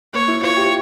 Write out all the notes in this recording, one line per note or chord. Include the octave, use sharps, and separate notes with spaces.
A#3 C#5
E4
F4 C#5
G4